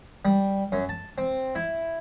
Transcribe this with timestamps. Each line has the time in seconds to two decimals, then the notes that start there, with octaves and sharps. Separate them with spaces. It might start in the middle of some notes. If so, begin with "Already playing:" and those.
0.25 G3
0.72 F#2
0.89 A5
1.18 C4
1.55 E4